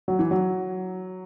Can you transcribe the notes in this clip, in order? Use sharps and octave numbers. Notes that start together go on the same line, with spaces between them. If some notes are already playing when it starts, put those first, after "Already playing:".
F#3
E3
F#3